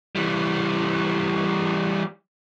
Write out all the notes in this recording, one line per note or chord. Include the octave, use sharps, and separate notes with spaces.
E3 G3